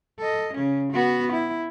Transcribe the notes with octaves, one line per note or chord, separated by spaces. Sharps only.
A4 D#5
C#3 C#4
B3 F#4
E4